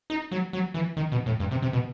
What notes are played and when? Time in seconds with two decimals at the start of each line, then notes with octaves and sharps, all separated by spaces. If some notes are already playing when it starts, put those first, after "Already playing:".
0.10 D#4
0.32 F#3
0.53 F#3
0.74 E3
0.97 D#3
1.12 B2
1.26 A2
1.40 G2
1.51 C3
1.62 C3
1.73 B2